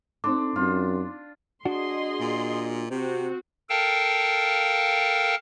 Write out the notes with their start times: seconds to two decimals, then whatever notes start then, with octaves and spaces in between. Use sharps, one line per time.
0.24 C4 D4 D#4 A4 C6 D6
0.56 F#2 C4 F4
1.65 D4 F#4 G#4 D#5 C6
2.20 A#2
2.90 C3 C4 F#4
3.70 A4 A#4 F5 G5 A5